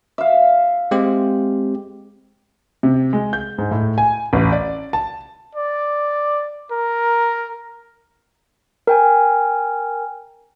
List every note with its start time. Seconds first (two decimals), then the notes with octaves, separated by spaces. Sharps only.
0.18 E5 F5
0.91 G#3 C4 G4
2.83 C3
3.13 G#3
3.33 G6
3.58 G#2
3.71 A2
3.98 G#5
4.33 A1
4.52 D5
4.93 A5
5.55 D5
6.71 A#4
8.87 A#4 G5 G#5